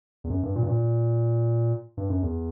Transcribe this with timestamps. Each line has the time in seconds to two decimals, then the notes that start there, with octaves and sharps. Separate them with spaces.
0.24 E2
0.30 F#2
0.43 G2
0.56 A#2
0.63 G2
0.68 A#2
1.97 G2
2.10 F#2
2.22 E2